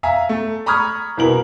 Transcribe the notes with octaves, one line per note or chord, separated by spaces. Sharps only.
E5 F5 G#5 A#5
A3
A#5 B5 C#6 D#6 F6 G#6
C2 B2 E4 A#4 F#7